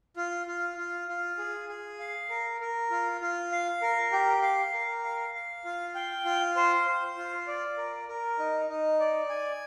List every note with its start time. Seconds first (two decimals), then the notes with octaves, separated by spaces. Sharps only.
0.17 F4
0.47 F4
0.78 F4
1.08 F4
1.38 G#4
1.69 G#4
1.99 F5
2.30 A#4
2.61 A#4
2.91 F4
3.21 F4
3.52 F5
3.82 A#4
4.12 G4
4.42 F5
4.73 A#4
5.04 F5
5.34 F5
5.65 F4
5.95 G5
6.25 F4
6.56 C5
6.86 C5
7.17 F4
7.47 D5
7.77 A#4
8.09 A#4
8.39 D#4
8.69 D#4
9.00 D5
9.30 G#5